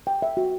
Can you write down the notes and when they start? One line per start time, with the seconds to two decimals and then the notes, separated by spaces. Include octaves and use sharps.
0.07 G5
0.22 E5
0.37 F#4